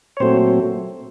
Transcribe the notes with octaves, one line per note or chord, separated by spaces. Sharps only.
C#5
A#2 F#3 A3 C4 C5